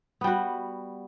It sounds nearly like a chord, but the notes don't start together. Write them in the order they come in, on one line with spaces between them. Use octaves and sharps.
B3 G3 F#4